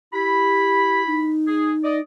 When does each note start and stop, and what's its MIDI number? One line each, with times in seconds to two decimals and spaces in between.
0.13 1.31 64
0.13 1.03 67
0.13 1.31 83
1.07 2.00 63
1.47 1.71 68
1.83 1.97 74
1.83 1.97 75